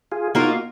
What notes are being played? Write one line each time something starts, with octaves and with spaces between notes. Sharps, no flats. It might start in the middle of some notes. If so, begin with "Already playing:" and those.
F4 G#4
A#3 D#4 F4 F#4 A#4